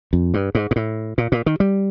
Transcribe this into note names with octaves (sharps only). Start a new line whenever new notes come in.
F2
G2
G#2
G#2
A2
A#2
A#2
D#3
G3